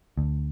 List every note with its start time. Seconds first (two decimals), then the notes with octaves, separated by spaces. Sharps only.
0.17 D2